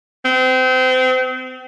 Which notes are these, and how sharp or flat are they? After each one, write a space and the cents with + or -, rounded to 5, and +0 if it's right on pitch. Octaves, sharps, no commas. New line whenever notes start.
C4 -30